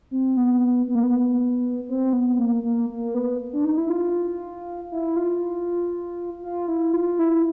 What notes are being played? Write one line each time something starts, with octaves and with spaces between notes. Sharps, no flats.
C4
B3
B3
A#3
B3
C4
B3
A#3
A#3
A#3
B3
D4
D#4
E4
F4
E4
F4
F4
E4
F4
E4